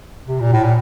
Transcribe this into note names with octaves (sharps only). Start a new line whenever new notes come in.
C3
A#2
A2
A#2